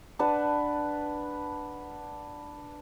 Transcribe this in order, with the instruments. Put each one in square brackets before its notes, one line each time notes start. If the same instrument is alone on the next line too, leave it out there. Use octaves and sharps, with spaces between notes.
[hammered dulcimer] D4 B4 F#5 A5